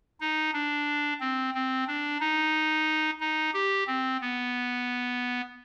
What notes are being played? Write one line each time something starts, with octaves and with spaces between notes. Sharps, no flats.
D#4
D4
C4
C4
D4
D#4
D#4
G4
C4
B3